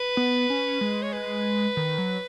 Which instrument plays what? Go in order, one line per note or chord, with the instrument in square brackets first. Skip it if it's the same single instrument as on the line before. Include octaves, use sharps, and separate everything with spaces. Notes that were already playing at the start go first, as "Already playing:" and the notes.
Already playing: [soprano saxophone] B4
[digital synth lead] B3
C#4
G#3
[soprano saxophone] C#5
B4
[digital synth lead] D#3
F#3